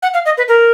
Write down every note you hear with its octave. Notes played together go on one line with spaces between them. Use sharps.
F#5
F5
D#5
B4
A#4